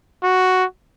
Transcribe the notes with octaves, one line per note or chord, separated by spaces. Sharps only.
F#4